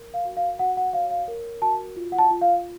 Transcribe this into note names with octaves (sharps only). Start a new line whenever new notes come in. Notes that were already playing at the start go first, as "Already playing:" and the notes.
Already playing: A#4
F5
F#4
F5
F#4 F#5
F#5
C#5 F5
F5
A#4
F#4 A5
F4
F#5
A5
F4
F5